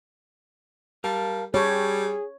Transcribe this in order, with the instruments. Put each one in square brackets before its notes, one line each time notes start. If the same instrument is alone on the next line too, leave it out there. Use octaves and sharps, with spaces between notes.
[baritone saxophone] G3 [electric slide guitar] A#4 F5 A5
[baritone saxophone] G3 [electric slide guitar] G4 A5 [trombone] G#4 [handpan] C#5